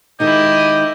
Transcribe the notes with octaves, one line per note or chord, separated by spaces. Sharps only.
D#3 G#3 D#4 E4 G4 D#5